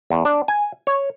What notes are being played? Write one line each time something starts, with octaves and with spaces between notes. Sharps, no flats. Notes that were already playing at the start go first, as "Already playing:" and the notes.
E2
D4
G#5
C#5